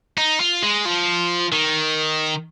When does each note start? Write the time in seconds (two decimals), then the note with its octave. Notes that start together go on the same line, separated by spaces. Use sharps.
0.18 D#4
0.40 F4
0.63 G#3
0.85 F3
1.52 D#3